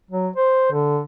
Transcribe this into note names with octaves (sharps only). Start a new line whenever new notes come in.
F#3
C5
D3